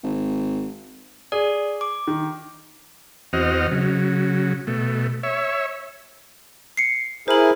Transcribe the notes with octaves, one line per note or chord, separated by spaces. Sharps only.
G#1
G#4 D5
D6
D#3
E2 C4 F#4 D#5 F6
C#3 F#3
B2 A3
C#5 E5
C7 C#7
E4 G#4 A#4 C5 F#7